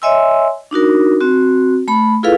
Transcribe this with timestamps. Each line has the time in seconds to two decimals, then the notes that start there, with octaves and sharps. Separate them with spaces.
0.02 C#5 D#5 E5 G#5 C6 E6
0.71 D4 D#4 F#4 A#4
1.20 C4 F#4
1.88 A3 B5
2.23 E4 F4 G#4 A4 B4 F5